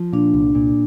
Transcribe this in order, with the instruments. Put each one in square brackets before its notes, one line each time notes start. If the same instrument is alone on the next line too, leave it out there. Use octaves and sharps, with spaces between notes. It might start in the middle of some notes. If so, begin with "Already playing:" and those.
Already playing: [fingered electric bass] F3
[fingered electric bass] A#2 [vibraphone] D4
[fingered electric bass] C2
A#2